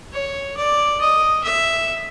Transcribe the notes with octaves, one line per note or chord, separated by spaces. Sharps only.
C#5
D5
D#5
E5